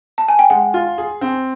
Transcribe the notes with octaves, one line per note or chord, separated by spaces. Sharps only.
A5
G#5
G5
G#3 F#5
F4
G#4
C4